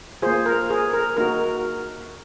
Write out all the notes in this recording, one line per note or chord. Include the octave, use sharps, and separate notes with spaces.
A#3 F4 G#4 C5
A#4
G#4
A#4
A#3 D#4 F#4 A#4